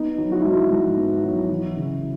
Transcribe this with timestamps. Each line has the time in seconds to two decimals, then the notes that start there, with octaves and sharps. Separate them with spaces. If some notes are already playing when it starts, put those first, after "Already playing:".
Already playing: B3 D#4
0.18 F#3
0.32 F#4
0.40 E4
0.44 G#2 D#4
0.56 E4
0.70 G#2
0.97 B3
1.24 F#3
1.50 E3
1.76 C#3